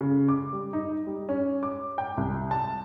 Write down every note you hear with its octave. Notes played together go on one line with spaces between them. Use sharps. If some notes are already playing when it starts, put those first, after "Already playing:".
C#3
D6
G3
D#4
G3
C#4
D6
G5
C2
A5